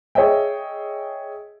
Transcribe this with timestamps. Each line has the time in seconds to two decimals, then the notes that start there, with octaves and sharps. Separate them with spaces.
0.15 G#4 C#5 D#5 E5 G5